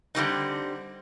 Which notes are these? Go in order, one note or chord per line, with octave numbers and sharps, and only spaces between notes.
D3 G3 C4 D#4